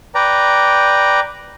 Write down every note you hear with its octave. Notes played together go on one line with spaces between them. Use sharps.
B4 D5 G5 A#5